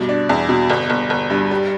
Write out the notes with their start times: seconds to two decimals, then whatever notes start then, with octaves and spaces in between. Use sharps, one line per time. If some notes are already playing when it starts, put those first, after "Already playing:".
Already playing: G2 B2
0.09 D4
0.29 E2
0.49 B2
0.70 G1
0.90 G1
1.10 G1
1.30 G2
1.51 G3